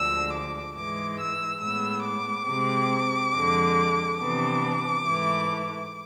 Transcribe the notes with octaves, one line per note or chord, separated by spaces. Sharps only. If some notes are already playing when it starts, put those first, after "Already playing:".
Already playing: D2 D3 F3 G#3 E6
D6
G#2 E3 G#3 D6
E6
A2 G#3 B3 E6
D6
C3 G#3 C4
F2 D3 G#3
C3 E3 B3 D4 D6
G#2 E3 A3